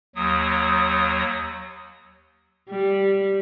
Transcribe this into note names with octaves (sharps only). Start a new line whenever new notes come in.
D#2 F#3 D#6
G3